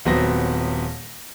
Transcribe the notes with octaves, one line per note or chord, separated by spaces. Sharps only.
D#1 F#3 B3 C4 A#6